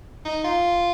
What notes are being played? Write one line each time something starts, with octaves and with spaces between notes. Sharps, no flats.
D#4
F4